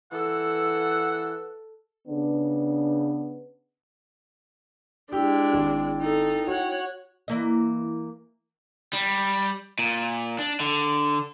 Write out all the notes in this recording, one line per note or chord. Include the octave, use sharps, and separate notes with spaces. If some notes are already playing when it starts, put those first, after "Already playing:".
E3 A4 F#5 E6
C#3 B3 D4
G#3 D4 E4 G4 G5
G#1
D#4 A4
F#4 C#5 F#5
E3 A#3 D#5
G3
A#2
D4
D3